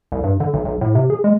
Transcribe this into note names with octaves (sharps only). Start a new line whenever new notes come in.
C2
G2
D3
B1
B1
A2
C3
G#4
G#3